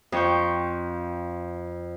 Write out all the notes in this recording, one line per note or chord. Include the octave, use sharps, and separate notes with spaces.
F2 C#6 G6